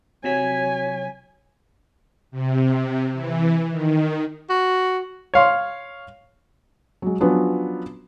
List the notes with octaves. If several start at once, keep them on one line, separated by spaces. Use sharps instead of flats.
C3 F#3 C#5 G#5 B6
C3
E3
D#3
F#4
C#5 F5 C6
F#3 G#3
F3 F#3 B3 C#4 D4